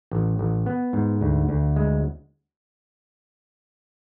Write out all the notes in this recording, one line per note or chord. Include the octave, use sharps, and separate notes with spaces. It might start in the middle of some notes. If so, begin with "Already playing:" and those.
A1
A1
B3
G#2
D2
D2
G#3